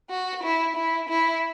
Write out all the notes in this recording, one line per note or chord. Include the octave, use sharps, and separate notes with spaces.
F#4
E4
E4
E4